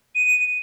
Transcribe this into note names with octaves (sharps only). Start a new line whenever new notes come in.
D#7